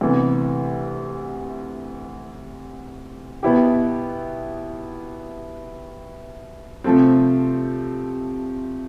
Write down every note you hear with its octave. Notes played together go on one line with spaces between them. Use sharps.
D2 C3 E3 B3
B2 B3 E4 G4
C3 F3 A3 C4